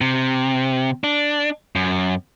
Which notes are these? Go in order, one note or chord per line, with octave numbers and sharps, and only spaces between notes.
C3
D4
F#2